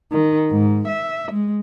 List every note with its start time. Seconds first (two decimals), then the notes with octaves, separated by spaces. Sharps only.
0.11 D#3
0.50 G#2
0.87 E5
1.30 G#3